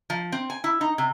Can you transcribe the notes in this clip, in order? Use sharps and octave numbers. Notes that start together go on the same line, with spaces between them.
F3
C4
G#5
E4
D#4
C3